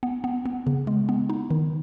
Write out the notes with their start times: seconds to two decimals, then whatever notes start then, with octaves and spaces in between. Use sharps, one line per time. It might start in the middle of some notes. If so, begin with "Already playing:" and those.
0.03 B3
0.24 B3
0.46 B3
0.67 C#3
0.87 G#3
1.09 B3
1.30 D#4
1.50 D#3